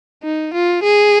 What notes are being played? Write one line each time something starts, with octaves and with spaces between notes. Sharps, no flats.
D#4
F4
G#4